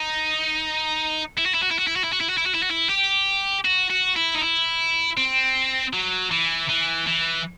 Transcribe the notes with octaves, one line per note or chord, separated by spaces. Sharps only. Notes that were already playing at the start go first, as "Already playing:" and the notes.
Already playing: D#4
E4
F#4
E4
F#4
E4
F#4
E4
F#4
E4
F#4
E4
F#4
E4
F#4
E4
F#4
E4
G4
F#4
F#4
E4
D#4
E4
C4
F#3
E3
E3
E3